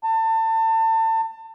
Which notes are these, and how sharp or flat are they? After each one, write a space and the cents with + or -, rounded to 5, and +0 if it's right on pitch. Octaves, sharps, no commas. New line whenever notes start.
A5 +30